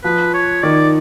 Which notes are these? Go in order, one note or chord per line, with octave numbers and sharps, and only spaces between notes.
F3 B4
C#5
D#3 D5